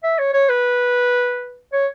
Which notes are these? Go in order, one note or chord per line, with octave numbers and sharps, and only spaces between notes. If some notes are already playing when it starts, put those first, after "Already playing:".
E5
C#5
C#5
B4
C#5